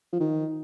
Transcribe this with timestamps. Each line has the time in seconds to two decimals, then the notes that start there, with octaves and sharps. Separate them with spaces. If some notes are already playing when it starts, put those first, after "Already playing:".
0.13 F3
0.20 D#3